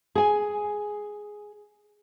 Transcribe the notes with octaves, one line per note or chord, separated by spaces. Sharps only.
G#4 G#5